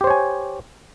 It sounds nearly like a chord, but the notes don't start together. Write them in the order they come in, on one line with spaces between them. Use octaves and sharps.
G4 C5 C#5 G#5